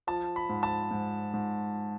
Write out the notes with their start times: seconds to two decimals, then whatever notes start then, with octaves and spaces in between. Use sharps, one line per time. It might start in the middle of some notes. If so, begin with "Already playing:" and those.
0.07 F3 A5
0.36 B5
0.50 G#2
0.63 A5
0.91 G#2
1.34 G#2